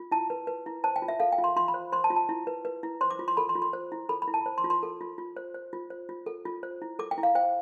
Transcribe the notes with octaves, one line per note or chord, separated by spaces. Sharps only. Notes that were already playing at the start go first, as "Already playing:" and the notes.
Already playing: F4
E4 A5
B4
B4
E4
C5 A5
G5
F4
E5
A4 F5
G5
F4
C6
F4 C6
B5
C5
C5 C6
A5
F4
A5
E4
B4
B4
E4
C5 C6
D6
F4
C6
A4 B5
C6
F4
C6
C5
E4
A4 B5
B5
E4
A5
C5
C6
F4
C6
A4
F4
F4
C5
C5
F4
C5
F4
A4
F4
C5
E4
A4 D6
G5
E4
F5
C5 G5